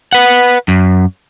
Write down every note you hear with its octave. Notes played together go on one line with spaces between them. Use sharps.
B4 F#5
F#2